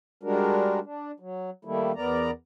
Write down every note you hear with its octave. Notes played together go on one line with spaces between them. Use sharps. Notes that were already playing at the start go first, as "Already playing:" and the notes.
G3 G#3 D4 F#4 A#4
D4
F#3
D#3 G3 A3 A#3 E4
E2 B3 A#4 D5 A#5